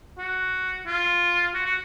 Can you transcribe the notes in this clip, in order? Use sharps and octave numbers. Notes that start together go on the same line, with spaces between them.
F#4
F4
F#4
F#4